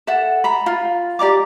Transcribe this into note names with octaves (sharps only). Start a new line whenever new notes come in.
A4 E5 F#5
A#5 B5
F4
G4 D5 A#5 D6